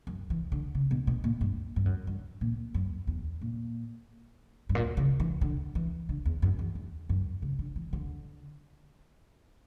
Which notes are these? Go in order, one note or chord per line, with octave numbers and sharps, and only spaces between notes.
F#2
E3
D3
C#3
B2
B2
A#2
G2
G2
F#2
G2
A#2
F#2
E2
A#2
G2
A#2
C#3
E3
D3
E3
D3
E2
F#2
E2
E2
F#2
C#3
D3
E3
D3